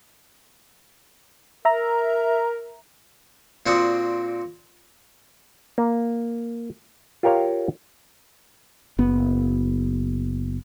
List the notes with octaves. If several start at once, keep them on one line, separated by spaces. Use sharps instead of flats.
A#4 E5 A#5
A#2 C4 D4 F#4 D#6
A#3
F4 G4 A#4 C#5 F5
F#1 B3